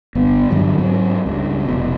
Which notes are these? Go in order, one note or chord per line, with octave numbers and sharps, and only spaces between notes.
G1 B3
G2 D3 F#3 G3
G#2 F#3 C4
C#2 G2
F1 B2